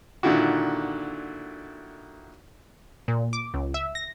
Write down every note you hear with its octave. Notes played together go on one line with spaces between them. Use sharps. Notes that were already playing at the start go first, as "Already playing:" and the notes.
A#2 D3 D#3 E4 F#4
A#2
D6
C#2
E5
A#6